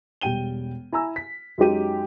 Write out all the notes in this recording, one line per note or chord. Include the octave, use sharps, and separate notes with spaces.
E1 G3 G5 D#7 G7
E4 G#5 A#5 E6
B6
F#2 G#3 D#4 G4 D#7